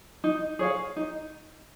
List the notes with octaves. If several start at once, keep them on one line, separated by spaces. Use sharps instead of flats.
D#4
G#4 C#5 F5
D#4